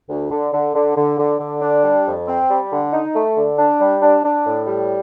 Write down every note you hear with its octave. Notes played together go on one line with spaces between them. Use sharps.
D2
D3
D3
D3
D3
D3
D3
D4
G3
F2
C4
G3
D3
D#4
A3
D3
D4
G3
D4
D4
A2
G3